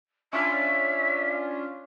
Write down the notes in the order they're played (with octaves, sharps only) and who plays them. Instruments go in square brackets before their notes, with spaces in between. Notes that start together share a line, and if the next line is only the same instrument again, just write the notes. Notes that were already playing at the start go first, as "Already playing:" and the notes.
[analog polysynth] C#4 D4 F4 [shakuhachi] E5